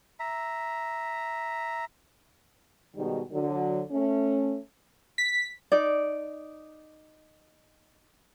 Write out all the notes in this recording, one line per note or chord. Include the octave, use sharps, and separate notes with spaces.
E5 A#5
G#2 B2 D#3 G3
D3 F#3
A3 C#4
B6
D#4 D5